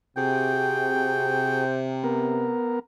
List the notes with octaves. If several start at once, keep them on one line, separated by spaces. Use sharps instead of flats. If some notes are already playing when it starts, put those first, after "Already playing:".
C3 F#4 G#4 G5
B3 A#4